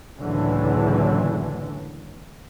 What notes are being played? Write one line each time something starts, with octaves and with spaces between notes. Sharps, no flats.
F#1 C#2 A2 D3 E3 F#3